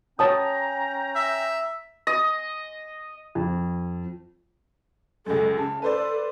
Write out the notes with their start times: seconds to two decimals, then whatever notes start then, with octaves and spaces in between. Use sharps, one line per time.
0.19 C#4 C#5 G5 A5 A#5 D#6
1.16 E5
2.07 D#5
3.35 F2
5.26 C#2 F#2 A4
5.57 C#3 A5
5.82 A4 B4 C5 D5